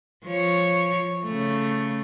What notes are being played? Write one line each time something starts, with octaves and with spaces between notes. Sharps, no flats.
F3 C#5
C#3 A3